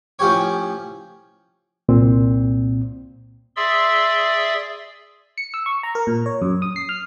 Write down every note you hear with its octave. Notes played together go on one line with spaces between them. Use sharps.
A2 F3 C#4 G4 C#5
C2 A#2 C4
G#4 D5 E5 C6 E6
C#7
E6
C#6
A#5
A#4
A#2
C#5
F#2
D#6
C7
F6